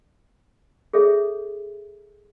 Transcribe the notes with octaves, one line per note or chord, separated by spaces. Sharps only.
G#4 A4 C#5 E5